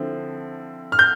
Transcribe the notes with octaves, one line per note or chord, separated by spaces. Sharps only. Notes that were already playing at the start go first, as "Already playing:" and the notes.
Already playing: D3 F3 C4 E4
F6
G6